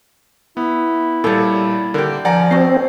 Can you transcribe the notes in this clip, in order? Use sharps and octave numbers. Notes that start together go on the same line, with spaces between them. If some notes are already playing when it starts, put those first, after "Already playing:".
B3 E4
A#2 G3 A4 C#5
D3 G4 A#4
F3 D5 F#5 G#5 A#5
C4 F#4 D#5 C7